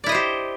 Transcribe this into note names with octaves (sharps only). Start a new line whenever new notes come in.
E4 G4 C5 D5 D#5